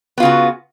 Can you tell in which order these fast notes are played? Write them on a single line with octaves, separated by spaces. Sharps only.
B3 F4 C#3 F#4